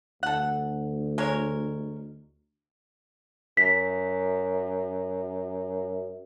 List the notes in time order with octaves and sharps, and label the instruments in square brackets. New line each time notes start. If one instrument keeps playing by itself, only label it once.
[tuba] D2 [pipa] A4 F#5
[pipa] G#3 A#4 C#5
[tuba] F#2 [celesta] B6